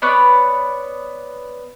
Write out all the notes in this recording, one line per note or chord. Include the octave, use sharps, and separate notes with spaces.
B3 B4 C#5 D5